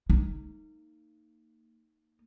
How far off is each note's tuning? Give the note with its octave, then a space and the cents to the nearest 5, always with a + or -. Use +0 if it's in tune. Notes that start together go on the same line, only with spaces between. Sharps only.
A#3 -30 D#4 +0